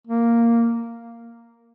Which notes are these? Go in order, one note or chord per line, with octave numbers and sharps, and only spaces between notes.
A#3